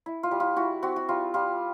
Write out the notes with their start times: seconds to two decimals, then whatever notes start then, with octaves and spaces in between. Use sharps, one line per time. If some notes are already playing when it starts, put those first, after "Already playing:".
0.06 E4
0.23 F4
0.31 G3
0.40 F4
0.56 E4 F#4
0.82 C4 F#4
0.96 F#4
1.09 G3 F4
1.34 G3 F4